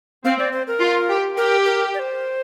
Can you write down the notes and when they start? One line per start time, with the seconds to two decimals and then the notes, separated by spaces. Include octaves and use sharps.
0.24 C4 F5
0.39 D5
0.53 C5
0.68 A#4
0.80 F4
1.09 G4
1.37 G4 A#4
1.65 A#4
1.94 D5
1.99 C5